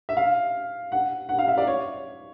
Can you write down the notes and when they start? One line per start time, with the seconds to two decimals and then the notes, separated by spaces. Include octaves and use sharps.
0.09 E5
0.17 F5
0.92 F#5
1.29 F#5
1.39 F5
1.48 E5
1.58 D5
1.67 C#5